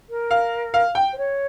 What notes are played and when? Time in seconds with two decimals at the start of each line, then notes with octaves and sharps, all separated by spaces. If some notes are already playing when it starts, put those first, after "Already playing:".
0.09 A#4
0.31 F5
0.74 F5
0.95 G5
1.12 C5
1.17 C#5